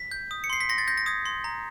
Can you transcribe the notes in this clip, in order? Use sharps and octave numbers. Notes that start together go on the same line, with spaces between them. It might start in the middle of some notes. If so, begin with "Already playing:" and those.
Already playing: B6
G6
D#6
C#7
C6 C7
B6
C6 A#6
A6
G6 A#6
A#6
D#6 G#6
C6
A#5